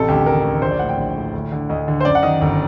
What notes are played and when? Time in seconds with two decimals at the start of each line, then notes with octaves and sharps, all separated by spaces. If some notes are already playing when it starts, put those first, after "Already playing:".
Already playing: A1 C3 A4
0.08 D2 G4
0.25 D#3 A#4
0.44 D2
0.62 A#1 C5
0.71 D5
0.79 A2 F#5
0.89 G5
0.98 A#1
1.16 A2
1.33 D2
1.52 D3
1.69 D2 D#5
1.88 D3
2.00 C5
2.05 F#2 D5
2.15 F#5
2.23 D#3 D#5
2.41 G1